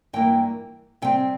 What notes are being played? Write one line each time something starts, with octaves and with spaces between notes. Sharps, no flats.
G2 E3 A#3 E4 G5
C3 G3 C4 G5